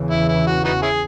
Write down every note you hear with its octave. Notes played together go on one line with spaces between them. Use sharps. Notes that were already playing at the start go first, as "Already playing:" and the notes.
Already playing: E2 C#3 E3
E4
E4
F#4
B3 D#4 F#4
C#4 E4 G#4